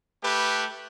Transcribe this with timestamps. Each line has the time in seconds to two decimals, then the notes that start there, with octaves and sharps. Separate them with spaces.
0.24 A3 G4 B4